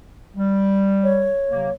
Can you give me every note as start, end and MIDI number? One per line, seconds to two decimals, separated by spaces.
0.36 1.32 55
1.03 1.72 73
1.51 1.70 48
1.51 1.70 54
1.51 1.70 58